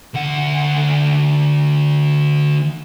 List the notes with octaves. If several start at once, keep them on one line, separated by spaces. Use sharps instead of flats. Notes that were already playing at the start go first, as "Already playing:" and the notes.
D2 F#5